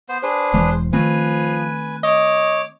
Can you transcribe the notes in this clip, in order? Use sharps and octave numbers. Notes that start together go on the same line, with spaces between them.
B3 C5
D4 G#4 B4 C5
E1 E3 G#3
D#3 F3 A3 C4 B4 G#5
C#5 D#5 D6